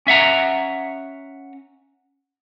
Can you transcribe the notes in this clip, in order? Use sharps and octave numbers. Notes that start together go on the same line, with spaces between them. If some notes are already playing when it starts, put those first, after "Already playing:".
C#4 E5 F#5 A#5